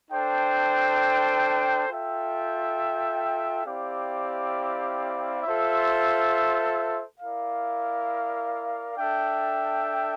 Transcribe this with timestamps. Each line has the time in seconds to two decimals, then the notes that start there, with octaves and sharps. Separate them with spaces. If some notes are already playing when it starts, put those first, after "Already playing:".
0.11 D4 A4 C5 G5
1.89 F4 A4 E5 G5
3.65 C4 E4 G4 D5 F5
5.43 F4 A4 C5 E5
7.20 E4 A#4 D5 F5
8.98 D4 A4 E5 G5